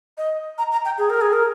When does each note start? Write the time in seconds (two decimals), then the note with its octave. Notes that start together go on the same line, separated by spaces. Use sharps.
0.18 D#5
0.58 A#5
0.72 A#5
0.85 G5
0.98 G#4
1.10 A#4
1.21 G#4
1.33 A#4